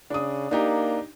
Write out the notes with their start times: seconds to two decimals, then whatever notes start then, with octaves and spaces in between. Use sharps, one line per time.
0.10 C#3 D4 D#6
0.51 A#3 D4 D#4 G4